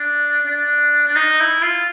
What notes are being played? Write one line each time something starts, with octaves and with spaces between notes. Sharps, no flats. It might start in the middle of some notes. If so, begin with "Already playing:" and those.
Already playing: D4
D4
D4
D#4
E4
F4